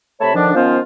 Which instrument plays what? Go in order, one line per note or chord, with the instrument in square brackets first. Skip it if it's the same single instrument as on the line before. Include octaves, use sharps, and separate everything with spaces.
[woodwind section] C3 A3 C#5 A5 B5
D3 D#3 F3 D4
D#3 F3 B3 C#4 F4 C5